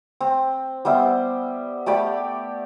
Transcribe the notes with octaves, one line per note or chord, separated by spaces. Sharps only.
C4
G3 B3 C5 E5
A3 G4 D5 B5